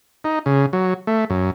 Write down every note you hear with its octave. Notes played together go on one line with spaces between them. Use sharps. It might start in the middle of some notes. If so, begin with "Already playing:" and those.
D#4
C#3
F#3
A3
F#2